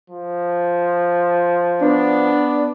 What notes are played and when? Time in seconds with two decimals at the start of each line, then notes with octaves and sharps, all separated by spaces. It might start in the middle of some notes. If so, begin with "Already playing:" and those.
0.10 F3
1.81 B3 D4